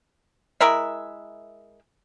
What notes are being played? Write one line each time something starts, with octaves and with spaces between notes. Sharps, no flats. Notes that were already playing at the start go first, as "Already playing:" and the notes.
G#3 E4 A#4 E5